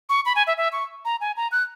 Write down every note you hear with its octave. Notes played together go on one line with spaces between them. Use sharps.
C#6
B5
G#5
E5
E5
C#6
A#5
G#5
A#5
F#6